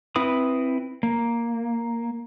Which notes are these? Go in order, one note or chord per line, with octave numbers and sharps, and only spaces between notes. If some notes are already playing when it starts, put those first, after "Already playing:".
C4 E4 B4 D#6
A#3